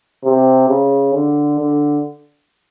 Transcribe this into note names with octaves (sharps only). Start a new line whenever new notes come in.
C3
C#3
D3
D3